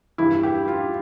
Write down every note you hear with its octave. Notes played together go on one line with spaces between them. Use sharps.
G2 E3 E4
G4
F4